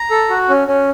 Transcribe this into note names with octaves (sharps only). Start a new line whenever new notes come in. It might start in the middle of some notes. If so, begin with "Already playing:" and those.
Already playing: A#5
A4
F#4
C#4
C#4